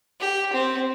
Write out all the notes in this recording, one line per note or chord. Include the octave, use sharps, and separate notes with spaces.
G4
C4